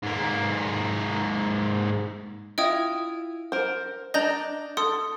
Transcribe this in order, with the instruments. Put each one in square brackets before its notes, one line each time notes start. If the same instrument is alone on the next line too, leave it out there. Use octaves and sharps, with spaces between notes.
[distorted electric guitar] G#2 A#3
[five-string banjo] E4 F4 [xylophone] D#5 G5 D#6
[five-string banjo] A#4 C5
[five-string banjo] D4 D#5 [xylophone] A#5 G6 A#6
[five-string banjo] A4 [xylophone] C6 D#6